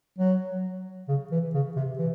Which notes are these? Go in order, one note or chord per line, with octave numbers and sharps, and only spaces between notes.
F#3
C#3
E3
C#3
C3
E3